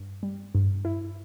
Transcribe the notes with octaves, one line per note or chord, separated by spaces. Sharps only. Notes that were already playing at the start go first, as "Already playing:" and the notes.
Already playing: G2
G3
G2
E4